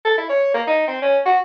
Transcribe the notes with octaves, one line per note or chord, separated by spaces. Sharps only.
A4
E4
C#5
A#3
D#4
C4
C#4
F#4